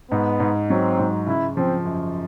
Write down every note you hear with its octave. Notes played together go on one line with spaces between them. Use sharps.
G#2 B3
G#2
F#3 C4
G#2
C#3 E4
F3 C4
F#2